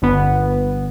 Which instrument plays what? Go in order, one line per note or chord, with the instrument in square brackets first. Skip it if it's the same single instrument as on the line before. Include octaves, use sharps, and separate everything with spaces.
[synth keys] G1 B3